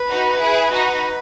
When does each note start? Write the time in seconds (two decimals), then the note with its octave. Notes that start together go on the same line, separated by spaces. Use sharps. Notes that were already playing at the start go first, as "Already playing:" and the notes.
Already playing: B4
0.10 D#4 F#4
0.39 E4 G#4
0.71 D#4 F#4